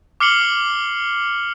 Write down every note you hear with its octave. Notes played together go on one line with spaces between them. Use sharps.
D6 F6 C7 C#7 F#7 G7